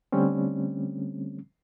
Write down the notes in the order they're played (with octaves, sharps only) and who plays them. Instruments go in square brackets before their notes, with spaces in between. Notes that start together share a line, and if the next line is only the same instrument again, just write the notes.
[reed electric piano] D3 G3 A3 C4 C#4